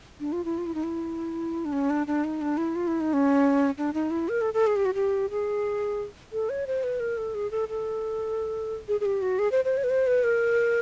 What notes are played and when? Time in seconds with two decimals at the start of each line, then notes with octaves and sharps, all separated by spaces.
0.20 D4
0.33 F4
0.45 E4
0.58 F4
0.66 E4
0.74 D#4
0.84 E4
1.65 D4
1.72 C#4
1.90 D4
2.07 D4
2.24 D#4
2.41 D4
2.57 E4
2.76 F4
2.87 E4
3.01 D#4
3.13 C#4
3.78 D4
3.94 D#4
4.11 E4
4.29 A#4
4.41 A4
4.54 A4
4.67 G#4
4.76 G4
4.85 F#4
4.94 G4
5.31 G#4
6.33 A4
6.50 C#5
6.67 C5
6.84 B4
7.00 A#4
7.17 A4
7.35 G#4
7.51 A4
7.69 A4
8.88 G#4
9.01 G#4
9.05 G4
9.22 F#4
9.39 G#4
9.52 C5
9.65 C5
9.77 C#5
9.84 B4
9.90 C5
10.07 B4
10.24 A#4